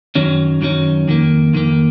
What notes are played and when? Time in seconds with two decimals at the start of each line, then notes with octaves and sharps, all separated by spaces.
0.15 F#2 D#3 F#3 C#4
0.61 F#2 D#3 F#3 C#4
1.08 F2 D#3 A#3
1.53 F2 D#3 A#3